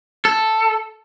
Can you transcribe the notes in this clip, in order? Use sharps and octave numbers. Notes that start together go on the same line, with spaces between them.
A4